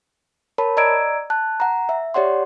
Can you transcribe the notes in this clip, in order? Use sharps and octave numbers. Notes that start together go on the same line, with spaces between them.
A#4 C#5 A5 B5
D5 D#5 A#5 E6 G#6 D7
A5 F#6
F#5 A#5
E5
G4 C#5 D5 F#5 C6